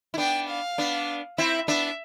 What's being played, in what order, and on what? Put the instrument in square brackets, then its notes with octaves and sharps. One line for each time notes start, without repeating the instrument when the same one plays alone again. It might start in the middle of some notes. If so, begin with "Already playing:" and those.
[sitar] E4
[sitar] B3 D4 [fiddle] G5
[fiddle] F5
[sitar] B3 D4
[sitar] C4 E4 [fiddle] E5
[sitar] B3 D4 [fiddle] E5